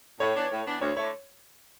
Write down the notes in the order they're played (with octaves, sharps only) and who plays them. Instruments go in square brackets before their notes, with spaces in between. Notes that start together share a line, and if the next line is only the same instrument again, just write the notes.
[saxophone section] A2 [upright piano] C#5
[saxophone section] E3 B3 D4
A2
E3 B3 D4
[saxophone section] D2 [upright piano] C#5
[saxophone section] D3 A3 E4 [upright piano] C#5